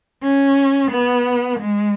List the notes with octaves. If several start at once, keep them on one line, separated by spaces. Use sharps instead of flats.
C#4
B3
G#3